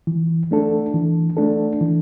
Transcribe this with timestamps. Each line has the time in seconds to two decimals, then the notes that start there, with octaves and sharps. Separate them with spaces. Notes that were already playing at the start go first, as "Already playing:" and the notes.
0.07 E3
0.51 A3 D4 A4
0.94 E3
1.37 A3 D4 A4
1.81 E3